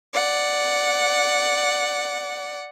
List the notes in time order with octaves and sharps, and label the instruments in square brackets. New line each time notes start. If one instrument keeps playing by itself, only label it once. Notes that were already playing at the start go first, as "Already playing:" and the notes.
[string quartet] D5 F#5